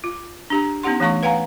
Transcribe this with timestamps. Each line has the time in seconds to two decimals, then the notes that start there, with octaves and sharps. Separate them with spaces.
0.04 F4
0.50 D4 G4 A#5
0.83 B3 C#4 D#4 G4 F#5 C6
1.00 E3 A3 C#4 C#6
1.23 B4 F5 F#5 G#5 A#5